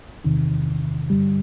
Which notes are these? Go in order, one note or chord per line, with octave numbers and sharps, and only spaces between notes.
E2 C3 D#3
G2 D3 G3